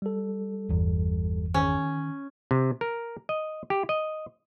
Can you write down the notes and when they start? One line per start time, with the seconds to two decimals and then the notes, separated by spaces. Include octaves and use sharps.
0.02 G3 A4
0.69 G1 E2
1.54 D#3 C#4
2.51 C3
2.81 A#4
3.29 D#5
3.70 G4
3.89 D#5